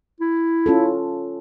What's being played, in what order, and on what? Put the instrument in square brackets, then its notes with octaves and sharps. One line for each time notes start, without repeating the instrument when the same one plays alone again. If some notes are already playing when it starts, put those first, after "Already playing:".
[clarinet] E4
[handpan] C#4 F4 A4